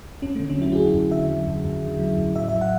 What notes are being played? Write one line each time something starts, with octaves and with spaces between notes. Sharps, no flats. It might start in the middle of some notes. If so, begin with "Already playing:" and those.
E2 C#4
A3
D3
C#4
F#3 E4
F#4
E2 G#4
E2
D3 E5
F#3
E2
E2
D3
F#3
E2
A2 E5
E5
F#3
F#5